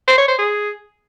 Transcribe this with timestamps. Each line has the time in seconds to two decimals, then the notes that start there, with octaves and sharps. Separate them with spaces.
0.08 C5
0.18 C#5
0.28 C5
0.39 G#4